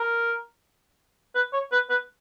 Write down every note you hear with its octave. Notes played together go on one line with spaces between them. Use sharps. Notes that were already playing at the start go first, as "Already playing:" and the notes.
Already playing: A#4
B4
C#5
B4
B4